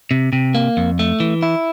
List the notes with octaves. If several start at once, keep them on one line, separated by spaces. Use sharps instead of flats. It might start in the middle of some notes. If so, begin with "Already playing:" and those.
C3
C3
A#3
F2
A3
E3
E4